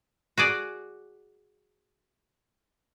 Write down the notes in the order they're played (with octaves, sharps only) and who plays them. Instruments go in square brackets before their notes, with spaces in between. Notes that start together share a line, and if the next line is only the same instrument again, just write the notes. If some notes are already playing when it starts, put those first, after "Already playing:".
[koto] F#4 G#4 D5